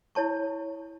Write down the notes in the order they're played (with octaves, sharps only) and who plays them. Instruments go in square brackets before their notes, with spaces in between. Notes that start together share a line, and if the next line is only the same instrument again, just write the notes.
[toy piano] E4 C#5 A5 C#6